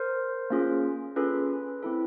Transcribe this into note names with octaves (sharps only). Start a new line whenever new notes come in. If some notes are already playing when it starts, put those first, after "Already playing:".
Already playing: A#4 C5
A#3 C#4 F4 G#4
C#4 F4 G#4 A4 B4
C4 E4 A4